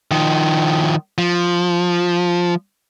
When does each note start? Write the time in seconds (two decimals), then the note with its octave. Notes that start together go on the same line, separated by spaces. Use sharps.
0.11 D#3 F3
1.18 F3